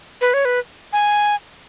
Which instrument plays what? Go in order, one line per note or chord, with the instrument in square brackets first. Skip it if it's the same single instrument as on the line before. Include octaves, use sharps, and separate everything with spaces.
[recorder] B4
C#5
B4
G#5